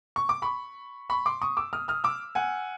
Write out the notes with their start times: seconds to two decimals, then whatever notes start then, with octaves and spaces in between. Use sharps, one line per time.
0.16 C#6
0.29 D6
0.42 B5 C#6
1.10 B5 C#6
1.26 C6 D6
1.42 C#6 D#6
1.57 D6 E6
1.73 D#6 F6
1.88 D#6 F6
2.04 D6 E6
2.35 F#5 G#5